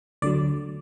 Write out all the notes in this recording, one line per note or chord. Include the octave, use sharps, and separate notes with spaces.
D2 D3 F#3 D5